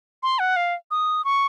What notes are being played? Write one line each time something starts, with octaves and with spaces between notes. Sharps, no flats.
C6
F#5
F5
D#6
C#6